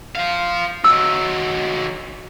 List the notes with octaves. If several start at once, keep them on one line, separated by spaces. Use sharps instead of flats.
C5 F5
D#3 F#3 E6